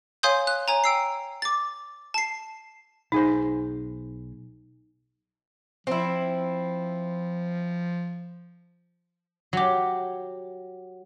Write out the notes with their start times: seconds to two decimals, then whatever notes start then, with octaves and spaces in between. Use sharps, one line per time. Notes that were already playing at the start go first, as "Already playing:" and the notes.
0.23 C#5 F5 G#5 C6 D#6 G6
0.47 F#6
0.68 C#5 G#5 A#5
0.84 G5 E6 C7
1.42 D6 A6
2.14 A5 C7
3.12 B1 D#4 G#4 C5
5.87 F3 C4 E4
9.53 F#3 G4